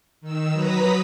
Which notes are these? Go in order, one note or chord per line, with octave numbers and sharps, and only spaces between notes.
D#3 E6
F#3 B4 A#5 D#6 B6